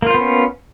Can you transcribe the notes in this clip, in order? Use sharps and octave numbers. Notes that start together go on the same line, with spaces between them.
A#3 B3 C#4 F4 C5